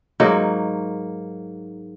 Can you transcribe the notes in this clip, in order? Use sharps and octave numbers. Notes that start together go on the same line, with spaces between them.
G#2 F#3 A#3 D#4